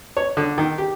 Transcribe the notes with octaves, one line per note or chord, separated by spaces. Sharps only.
C#5
D3
D#3
G4